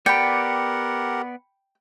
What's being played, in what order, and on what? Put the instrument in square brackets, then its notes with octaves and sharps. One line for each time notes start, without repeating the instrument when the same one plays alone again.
[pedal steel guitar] B3 D5 [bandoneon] G4 A#4 F#5 [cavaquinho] G5 [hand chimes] B5 C#7